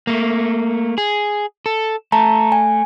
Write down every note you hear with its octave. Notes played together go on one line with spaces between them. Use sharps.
A3 A#3
G#4
A4
A3 A5 A#5
G#5